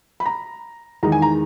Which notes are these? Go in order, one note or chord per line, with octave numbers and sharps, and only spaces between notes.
B5
A#5
E2 D#3 G#3 D#4 A#5
G#5
A#5